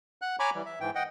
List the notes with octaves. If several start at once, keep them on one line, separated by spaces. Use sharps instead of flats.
F#5 F#6
C#5 G#5 A#5 B5 C#6 D6
E3 G3
E5
G#2 E3 G5
D#5 F#5 G5